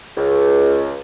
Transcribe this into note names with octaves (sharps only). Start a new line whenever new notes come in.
C#2